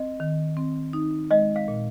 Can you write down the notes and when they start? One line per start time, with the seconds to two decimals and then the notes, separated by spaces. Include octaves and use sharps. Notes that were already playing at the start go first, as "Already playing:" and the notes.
Already playing: C4 D#5
0.20 D#3
0.57 C4
0.93 D#4
1.31 G#3 D#5
1.56 F5
1.68 A#2